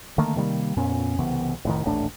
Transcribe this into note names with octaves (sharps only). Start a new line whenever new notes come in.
D3 D#3 A3 A#3
C3 D#3 G3 A#3
F2 A#2 B3 C#4
C2 C#3 E3 B3
F1 A2 D#3
D#1 A1 A3 D4